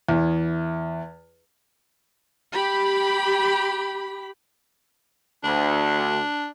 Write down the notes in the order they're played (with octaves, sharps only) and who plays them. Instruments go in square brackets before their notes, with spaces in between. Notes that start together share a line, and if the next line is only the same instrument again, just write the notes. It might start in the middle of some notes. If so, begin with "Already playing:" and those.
[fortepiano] E2
[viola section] G4 B5
[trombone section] D2 [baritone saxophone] D4